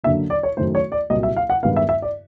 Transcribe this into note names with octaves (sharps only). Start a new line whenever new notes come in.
F#2 D3 F#3 A#3 E5
D5
C#5
F#2 D#3 F#3 A3 C5
C#5
D5
C2 A#2 F#3 A#3 D#5
E5
F5
F#5
G2 D#3 G#3 B3 F5
E5
E5
D5